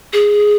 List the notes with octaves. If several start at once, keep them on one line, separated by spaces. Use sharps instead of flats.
G#4